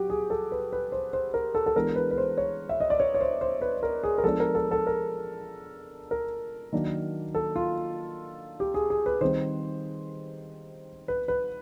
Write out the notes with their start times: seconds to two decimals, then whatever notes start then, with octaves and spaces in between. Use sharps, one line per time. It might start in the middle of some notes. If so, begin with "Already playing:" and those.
Already playing: F#3 F#4 G4
0.10 G#4
0.30 A4
0.52 B4
0.73 B4
0.92 C5
1.13 C5
1.34 A#4
1.55 A4
1.66 A4
1.76 E3 G#3 B3 D4 A#4
1.96 B4
2.11 B4
2.18 C5
2.37 C#5
2.69 E5
2.80 D#5
2.90 D5
3.00 C#5
3.14 C#5
3.21 C5
3.41 C5
3.61 B4
3.83 A#4
4.03 G#4
4.18 A#4
4.24 F3 G#3 B3 D4 A4
4.40 A#4
4.55 A4
4.71 A4
4.87 A#4
6.11 A#4
6.72 D#3 F#3 A#3 D4
7.34 A4
7.56 F4
8.60 G4
8.74 G#4
8.90 G#4
9.06 B4
9.21 D#3 G3 C4 C5
11.08 B4
11.28 B4